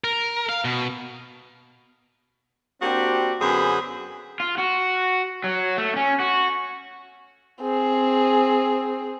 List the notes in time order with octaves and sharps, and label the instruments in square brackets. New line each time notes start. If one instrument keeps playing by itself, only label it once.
[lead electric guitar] A#4
F5
B2
[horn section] A#3 C4 D4 F#4 G4
F#2 D3 B3 G#4 C5 B5
[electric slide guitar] F4
F#4
F#3
A3
C#4
F#4
[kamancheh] C4 G#4